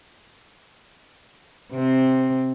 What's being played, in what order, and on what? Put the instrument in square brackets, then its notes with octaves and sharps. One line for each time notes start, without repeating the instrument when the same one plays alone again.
[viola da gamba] C3 C4